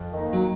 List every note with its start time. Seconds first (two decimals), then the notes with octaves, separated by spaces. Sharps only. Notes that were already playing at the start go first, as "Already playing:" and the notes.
Already playing: F2
0.12 D#3 A#3 D#4
0.33 F#3